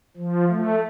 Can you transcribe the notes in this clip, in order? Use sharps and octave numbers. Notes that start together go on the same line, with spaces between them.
F3
A3